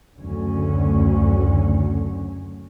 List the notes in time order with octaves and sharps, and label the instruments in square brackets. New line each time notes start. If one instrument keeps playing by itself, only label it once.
[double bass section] F#1 D2 D3 F#3 C#4